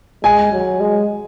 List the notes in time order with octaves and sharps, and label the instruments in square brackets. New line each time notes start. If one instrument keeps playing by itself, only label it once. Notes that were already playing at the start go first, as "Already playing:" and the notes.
[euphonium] G#3 [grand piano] G#5
[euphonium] F#3
G#3